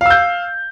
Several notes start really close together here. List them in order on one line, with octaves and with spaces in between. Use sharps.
F5 E6 G6